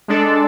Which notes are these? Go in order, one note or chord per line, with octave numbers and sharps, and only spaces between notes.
G#3 D4 A4 D5